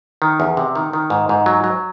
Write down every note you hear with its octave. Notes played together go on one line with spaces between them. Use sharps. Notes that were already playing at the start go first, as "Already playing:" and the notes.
D#3
E2
C3
D#3
D#3
G#2
G#2
F#3
F#3